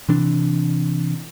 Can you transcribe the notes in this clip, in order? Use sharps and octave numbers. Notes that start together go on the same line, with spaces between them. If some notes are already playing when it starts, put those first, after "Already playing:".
C3 E3 D4